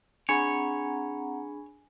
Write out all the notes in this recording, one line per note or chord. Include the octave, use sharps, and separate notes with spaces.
C4 D4 G#4 C#5 F#5 G#5 A#5 B5